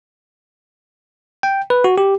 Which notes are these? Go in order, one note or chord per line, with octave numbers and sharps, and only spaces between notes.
G5
B4
F#4
G4